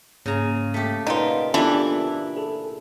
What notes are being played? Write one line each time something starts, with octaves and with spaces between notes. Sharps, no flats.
G#2 C#3 A#3 A#5
A3 G4
A#2 D#4 F4 B4 D#5 F#5 G5
E3 B3 D4 E4 F4 G4 A4
G#4 A4 A5